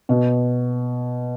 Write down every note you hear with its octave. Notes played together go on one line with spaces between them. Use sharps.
B2